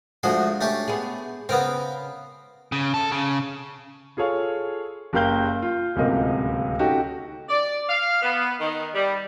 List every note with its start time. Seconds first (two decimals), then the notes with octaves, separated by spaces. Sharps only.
0.23 D2 F3 G#3 D4 F#4 G#4
0.61 A3 C#4 G4
0.88 B3 G#4
1.49 C#3 B3 C4 A#4
2.72 C#3
2.94 A4
3.12 C#3
4.17 F4 G#4 A4 C#5 F5
5.13 F#1 G4 A#4 F5 G6 G7
5.62 F4
5.96 D1 C#2 C3 A#3 D#5
6.79 C#4 D#4 F#4 G4 A4 D#5
7.49 D5
7.89 F5
8.22 B3
8.60 D#3
8.94 G3